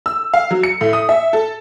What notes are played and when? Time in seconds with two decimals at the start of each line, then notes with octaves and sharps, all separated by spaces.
0.06 E6
0.34 F5
0.51 F#3
0.63 C#7
0.81 A2
0.93 D#6
1.09 E5
1.33 A4